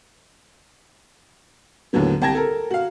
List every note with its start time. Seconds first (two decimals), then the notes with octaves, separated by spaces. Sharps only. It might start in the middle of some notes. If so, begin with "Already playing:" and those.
1.93 D#2 A2 D3 F#3 B3
2.22 C2 G5 A5 G#6 A#6
2.35 A4 A#4
2.71 F#4 F5